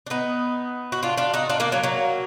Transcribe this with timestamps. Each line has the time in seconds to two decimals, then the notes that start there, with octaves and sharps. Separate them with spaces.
0.07 D4
0.10 B3 D#4
0.92 F#4
1.03 D4 F4
1.18 D4 F4
1.34 D#4 F#4
1.49 D4 F4
1.60 A#3 D4
1.72 F#3 A#3
1.84 F#3 A#3